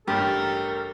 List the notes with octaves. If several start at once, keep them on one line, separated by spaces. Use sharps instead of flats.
A1 G2 G4 A4 A#4